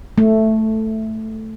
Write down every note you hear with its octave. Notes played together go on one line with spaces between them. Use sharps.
A3